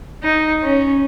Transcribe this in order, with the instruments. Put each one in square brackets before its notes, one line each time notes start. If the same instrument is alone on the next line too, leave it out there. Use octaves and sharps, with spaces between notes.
[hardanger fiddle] D#4
C#4